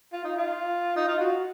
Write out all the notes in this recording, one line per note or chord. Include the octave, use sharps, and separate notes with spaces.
F4
D#4
F4
D#4
F4
F#4